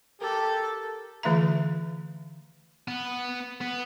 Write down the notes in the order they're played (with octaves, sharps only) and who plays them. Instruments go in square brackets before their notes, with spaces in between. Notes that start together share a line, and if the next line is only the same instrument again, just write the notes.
[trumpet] G4 [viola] A4 [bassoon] A#4
[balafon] D3 E3 A3 F4 E5 A#5
[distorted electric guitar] B3
B3